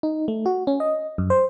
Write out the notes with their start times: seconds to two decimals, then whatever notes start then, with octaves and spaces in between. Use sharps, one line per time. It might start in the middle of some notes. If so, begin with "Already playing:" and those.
0.03 D#4
0.28 A3
0.46 F#4
0.67 C#4
0.80 D#5
1.18 F#2
1.30 C5